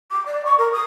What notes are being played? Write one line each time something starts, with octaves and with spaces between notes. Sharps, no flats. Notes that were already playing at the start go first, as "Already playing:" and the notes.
D6
D5
C#6
A#4
D#6